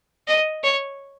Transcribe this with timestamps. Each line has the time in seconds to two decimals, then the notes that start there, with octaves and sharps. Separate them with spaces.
0.28 D#5
0.64 C#5